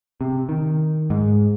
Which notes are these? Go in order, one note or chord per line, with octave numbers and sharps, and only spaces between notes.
C3
D#3
G#2